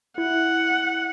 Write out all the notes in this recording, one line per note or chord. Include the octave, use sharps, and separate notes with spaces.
E4 F#5